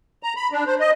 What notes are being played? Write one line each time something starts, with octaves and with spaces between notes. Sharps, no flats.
A#5
B5
D4
C5
D#5